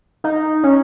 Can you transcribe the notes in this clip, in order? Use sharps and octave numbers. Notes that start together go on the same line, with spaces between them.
D#4
C#4